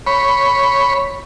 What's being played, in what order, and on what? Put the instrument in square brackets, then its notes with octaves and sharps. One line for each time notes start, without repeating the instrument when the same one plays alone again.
[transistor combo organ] C#5 B5